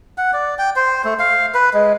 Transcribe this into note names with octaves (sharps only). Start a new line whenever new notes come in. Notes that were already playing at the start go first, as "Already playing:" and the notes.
F#5
D5
G5
C5
A3
F5
B4
G#3